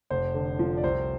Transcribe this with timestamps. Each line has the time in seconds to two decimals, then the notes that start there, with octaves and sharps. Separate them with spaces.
0.10 F1 C5
0.34 D3
0.59 F3
0.77 D5
0.83 C2 C5